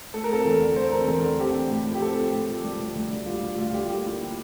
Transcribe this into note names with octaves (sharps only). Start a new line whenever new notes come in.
A3 A4
A#4
C4 A4
E2
D3
A3 C5
C4 A#4
E2 A4
D3
C4 G4
A2
A2
F3
G4
C4 A4
A2
A2
F3
G3 G4
D2
D2
D3
G3 F4
D2
D2 F4
D3 G4
F4
A#3 G4
E4